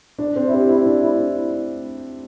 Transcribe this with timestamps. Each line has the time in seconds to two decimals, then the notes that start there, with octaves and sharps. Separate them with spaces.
0.19 D4
0.36 C4
0.48 E4
0.53 G4
0.69 E4
0.86 D4
1.03 E4